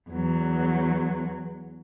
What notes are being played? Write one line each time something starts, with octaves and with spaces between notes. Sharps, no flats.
E2 F#3